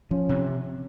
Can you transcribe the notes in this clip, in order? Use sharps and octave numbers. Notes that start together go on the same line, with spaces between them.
F3 C#4
C3